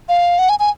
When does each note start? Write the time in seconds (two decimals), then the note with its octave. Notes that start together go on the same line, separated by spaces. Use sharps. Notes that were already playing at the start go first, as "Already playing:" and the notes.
0.09 F5
0.39 F#5
0.49 G#5
0.60 G#5